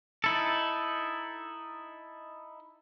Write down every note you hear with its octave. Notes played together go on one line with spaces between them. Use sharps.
D#4 E4 A4